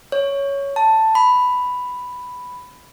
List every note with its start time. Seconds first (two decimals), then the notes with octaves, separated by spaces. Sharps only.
0.12 C#5
0.76 A5
1.15 B5